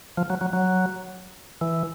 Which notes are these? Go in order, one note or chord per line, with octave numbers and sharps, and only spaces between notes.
F3
F#3
F#3
F#3
E3